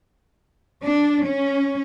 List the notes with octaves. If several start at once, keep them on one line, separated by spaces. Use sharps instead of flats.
D4
C#4